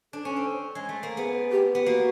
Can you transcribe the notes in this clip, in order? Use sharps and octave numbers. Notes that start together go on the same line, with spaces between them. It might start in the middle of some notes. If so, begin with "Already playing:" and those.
D4 A4
C#4
C4
G#3
A3
A#3
B3 G#4
G4
B3
A#3 F#4